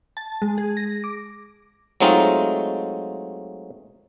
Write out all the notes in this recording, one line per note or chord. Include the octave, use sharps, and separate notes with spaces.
A5
G#3
G#4
A#6
D6
F#3 G#3 A3 C4 D#4 F4